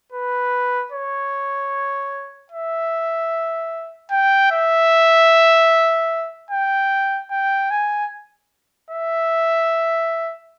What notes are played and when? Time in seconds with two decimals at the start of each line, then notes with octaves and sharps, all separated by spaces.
0.12 B4
0.92 C#5
2.52 E5
4.11 G5
4.51 E5
6.50 G5
7.31 G5
7.70 G#5
8.90 E5